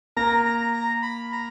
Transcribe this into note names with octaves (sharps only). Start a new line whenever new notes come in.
A#3 A#4 A#5
A#5
A#5
B5
A#5